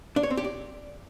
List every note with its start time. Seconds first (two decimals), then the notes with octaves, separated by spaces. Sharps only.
0.16 D4
0.23 C#5
0.30 C4
0.37 G4
0.44 D5